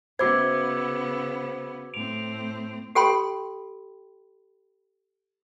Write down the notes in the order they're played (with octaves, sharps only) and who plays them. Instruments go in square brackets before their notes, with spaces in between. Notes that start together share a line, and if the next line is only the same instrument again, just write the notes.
[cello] C#3 B3 [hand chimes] F#4 D6 G#6 [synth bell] C5 B5 E6
[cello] A2 C4 [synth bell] D7 F7
[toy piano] G4 A4 G5 B5 C6